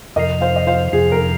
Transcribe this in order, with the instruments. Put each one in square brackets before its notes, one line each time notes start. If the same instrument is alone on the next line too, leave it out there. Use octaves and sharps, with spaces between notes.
[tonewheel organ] F2 C3 F3 [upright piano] A#4 D#5
[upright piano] C5 F5
D#5
C5 F5
[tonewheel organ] F2 C3 F3 [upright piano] G#4
[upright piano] A#4